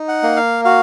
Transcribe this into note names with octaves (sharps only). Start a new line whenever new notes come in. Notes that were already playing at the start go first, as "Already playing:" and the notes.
Already playing: D#4
F#5
A#3
F5
F#4 F5